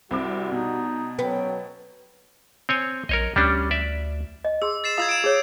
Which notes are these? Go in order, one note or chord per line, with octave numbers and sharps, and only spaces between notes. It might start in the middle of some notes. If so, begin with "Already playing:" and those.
C2 G3 C4 F#4 D6
B2 D#4
F#3 B3 C#4 C#5 G5
C4 C#5 G#5
A#1 A#4 C#5 D#5
D2 G3 C#4 D4
D5 E5
D#5
G#4 C6 E6
A6 C7 E7
F4 F5 A#5 D#6 E6 G#6
D7 E7
G#4 C#5